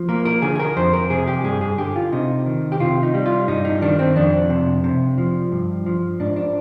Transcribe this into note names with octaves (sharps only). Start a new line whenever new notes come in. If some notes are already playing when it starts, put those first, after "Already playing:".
Already playing: F3
A#3 A#4
A#4
D3 G#4
G#4
A#4
F2 C5
A#4
C3 G#4
G4
G2 G#4
G#4
D3 G4
F4
C3 D#4
D#3
G4
C3 F4
D#4
G3
F4
G2 D#4
D#4
D#3 D4
C4
F2 D4
C3
C3
F3
G2
F3
G#2 D4
D4